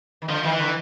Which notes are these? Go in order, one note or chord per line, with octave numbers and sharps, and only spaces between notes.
D#3
D3 F3
D#3 F3
E3
D3